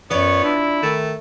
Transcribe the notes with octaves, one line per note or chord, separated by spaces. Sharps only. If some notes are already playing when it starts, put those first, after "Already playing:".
F#2 B3 F4 C#5 D5
D4 E4
D#3 A3